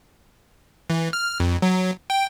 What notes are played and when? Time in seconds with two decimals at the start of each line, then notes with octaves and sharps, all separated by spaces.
0.90 E3
1.13 F6
1.40 F2
1.62 F#3
2.10 G5